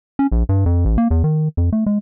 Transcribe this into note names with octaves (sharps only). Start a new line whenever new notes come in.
C#4
A#1
G2
F2
A1
A#3
E2
D#3
F2
A3
G#3